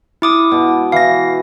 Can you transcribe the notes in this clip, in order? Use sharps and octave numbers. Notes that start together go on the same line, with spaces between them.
E4 D6 D#6
B2
E3 F5 A#6